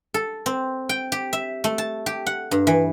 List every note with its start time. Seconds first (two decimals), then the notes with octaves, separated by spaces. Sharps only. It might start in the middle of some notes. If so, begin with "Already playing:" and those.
0.14 A4
0.46 C4
0.89 G5
1.12 G4
1.33 E5
1.64 A3
1.78 A5
2.06 G4
2.26 F#5
2.51 G2
2.67 E3